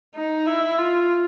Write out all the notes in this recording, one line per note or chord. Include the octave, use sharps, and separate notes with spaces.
D#4
E4
F4